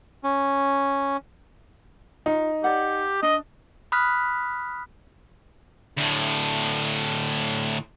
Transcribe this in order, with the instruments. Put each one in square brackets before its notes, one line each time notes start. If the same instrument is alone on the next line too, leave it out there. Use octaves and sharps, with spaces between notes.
[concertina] C#4
[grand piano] D#4 [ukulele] F4
[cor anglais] G4 [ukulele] D5 F#5
[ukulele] D4 [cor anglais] D#5
[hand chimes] B5 D#6 F6 F#6 B6
[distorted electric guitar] D2 A2